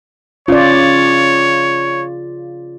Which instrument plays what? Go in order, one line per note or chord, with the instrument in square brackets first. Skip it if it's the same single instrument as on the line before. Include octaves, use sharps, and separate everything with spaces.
[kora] C#3 [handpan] F4 D5 [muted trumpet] C#5